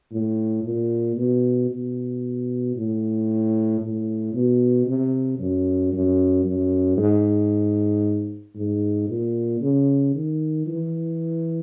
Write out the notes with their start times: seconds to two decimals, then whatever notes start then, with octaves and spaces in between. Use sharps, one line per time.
0.12 A2
0.64 A#2
1.17 B2
1.71 B2
2.76 A2
3.81 A2
4.34 B2
4.86 C3
5.39 F#2
5.92 F#2
6.45 F#2
6.97 G#2
8.55 G#2
9.08 A#2
9.61 C#3
10.14 D#3
10.67 E3